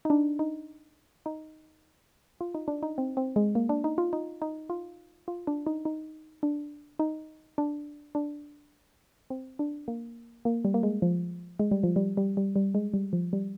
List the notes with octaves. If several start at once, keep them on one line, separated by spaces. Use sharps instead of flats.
D#4
D4
D#4
D#4
F4
D#4
D4
D#4
C4
C4
G#3
A#3
D4
D#4
F4
D#4
D#4
F4
F4
D4
D#4
D#4
D4
D#4
D4
D4
C4
D4
A#3
A#3
G3
A#3
G#3
F3
G#3
G3
F3
G3
G3
G3
G3
G#3
G3
F3
G3